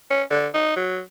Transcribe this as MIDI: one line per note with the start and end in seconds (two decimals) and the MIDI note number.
0.11 0.23 61
0.30 0.47 50
0.54 0.75 63
0.76 1.00 54